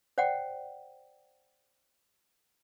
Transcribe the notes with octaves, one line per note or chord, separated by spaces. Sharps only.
C5 D5 F#5 G5